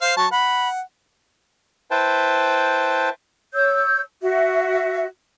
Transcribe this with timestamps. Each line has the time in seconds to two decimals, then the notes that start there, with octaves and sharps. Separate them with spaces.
0.02 C5 F5
0.17 F#3 A5 C#6
0.31 F#5 B5
1.91 E4 B4 C5 G5 A5
3.53 C#5 E6 G6
4.22 F#4 E5